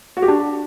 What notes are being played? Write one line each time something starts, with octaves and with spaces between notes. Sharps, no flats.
F#4
G4
D4